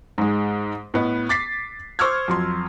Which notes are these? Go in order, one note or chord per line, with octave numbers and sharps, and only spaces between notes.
G#2 G#3
A2 B3 D#5
D6 A6 B6 C7
C5 C#6 D6 E6 F6 G#6
F2 F#3 C6